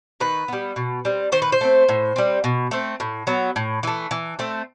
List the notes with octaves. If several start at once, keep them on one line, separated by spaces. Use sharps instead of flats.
D#3 B4
G3 B3
B2
G3 C4
D#3 C5
B4
C5
A3 C4
A2
G3 C4
B2
A3 C4
A2
F#3 B3
A2
E3 A3
E3
A3 C4